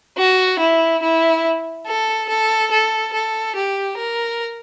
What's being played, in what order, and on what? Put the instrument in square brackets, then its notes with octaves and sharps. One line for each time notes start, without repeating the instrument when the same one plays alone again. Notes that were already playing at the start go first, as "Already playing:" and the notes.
[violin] F#4
E4
E4
A4
A4
A4
A4
G4
A#4